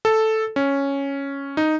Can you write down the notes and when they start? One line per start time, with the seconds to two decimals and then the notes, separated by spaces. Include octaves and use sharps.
0.05 A4
0.56 C#4
1.57 D#4